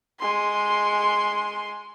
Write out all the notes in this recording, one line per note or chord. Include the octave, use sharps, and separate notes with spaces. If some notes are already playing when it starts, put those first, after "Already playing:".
G#3 C6